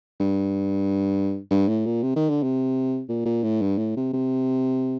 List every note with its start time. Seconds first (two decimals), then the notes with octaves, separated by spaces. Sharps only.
0.20 G2
1.51 G2
1.69 A2
1.86 A#2
2.03 C3
2.16 D#3
2.29 D3
2.43 C3
3.09 A#2
3.25 A#2
3.43 A2
3.62 G2
3.78 A2
3.97 C3
4.13 C3